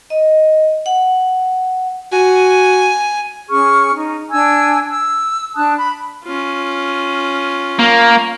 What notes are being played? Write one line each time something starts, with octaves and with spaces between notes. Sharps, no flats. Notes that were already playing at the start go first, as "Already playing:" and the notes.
D#5
F#5
F#4 G#5
C#4 G#4 C#6 F6
D#4
D4 G#5 E6 G#6
E6
D4 A5 D#6 F#6
B5
C#4 F4
A#3